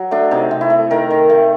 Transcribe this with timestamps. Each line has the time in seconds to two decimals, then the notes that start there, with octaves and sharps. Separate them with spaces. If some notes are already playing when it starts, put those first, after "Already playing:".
Already playing: F#3
0.11 A3 D4
0.31 C3 D#4
0.51 C3
0.61 E4
0.70 A3
0.91 D#3 A#4
1.10 D#3
1.30 A3